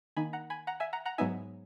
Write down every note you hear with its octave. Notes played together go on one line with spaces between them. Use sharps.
D#3 A#3 D#4 G#5 B5
F#5 A#5
G#5 B5
F#5 A#5
E5 G#5
F#5 A#5
F#5 A#5
G#2 F#3 B3 D#4 E5 G#5